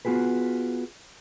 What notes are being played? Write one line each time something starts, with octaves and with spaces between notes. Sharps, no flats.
B3 F4 F#4 G#4 B4